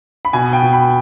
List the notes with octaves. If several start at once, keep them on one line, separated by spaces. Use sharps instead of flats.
B5
B2 G#5
G5
B2
B5